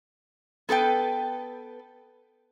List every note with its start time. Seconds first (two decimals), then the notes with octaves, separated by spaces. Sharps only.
0.69 B3 A4 B4 G5